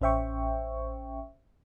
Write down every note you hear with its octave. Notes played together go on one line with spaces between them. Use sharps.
A1 C#4 C5 E5 G5 C#6